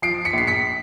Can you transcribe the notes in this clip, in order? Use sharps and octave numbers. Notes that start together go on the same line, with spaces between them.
F3 C7 D7
B6 C#7
A#1 C7
B6 C#7